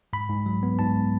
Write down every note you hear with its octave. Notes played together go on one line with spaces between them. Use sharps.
G#2 B5
G#2
F#3
B3
G#2 A5